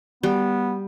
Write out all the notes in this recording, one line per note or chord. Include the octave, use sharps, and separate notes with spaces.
G3 B3